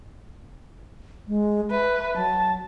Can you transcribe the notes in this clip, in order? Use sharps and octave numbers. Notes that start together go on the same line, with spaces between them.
G#3
B4 E5
F#3 A5